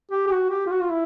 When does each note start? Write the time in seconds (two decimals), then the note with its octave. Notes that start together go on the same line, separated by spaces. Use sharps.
0.12 G4
0.27 G4
0.31 F#4
0.50 G4
0.66 F4
0.71 F#4
0.81 F4
0.90 E4